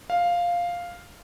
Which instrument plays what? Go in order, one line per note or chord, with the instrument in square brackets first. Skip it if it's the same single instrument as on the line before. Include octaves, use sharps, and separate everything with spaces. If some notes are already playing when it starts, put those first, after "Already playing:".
[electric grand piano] F5